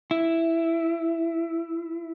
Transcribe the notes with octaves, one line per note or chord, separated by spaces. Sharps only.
E4